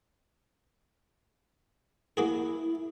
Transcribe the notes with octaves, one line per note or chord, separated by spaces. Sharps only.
A#3 E4 F#4 G#4